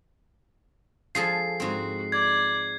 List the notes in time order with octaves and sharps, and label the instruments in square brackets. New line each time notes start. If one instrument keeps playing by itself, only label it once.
[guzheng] F3 G#4 A4 [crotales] C7
[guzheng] G#2 C4 [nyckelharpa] F#4
[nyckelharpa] D5 [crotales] G#6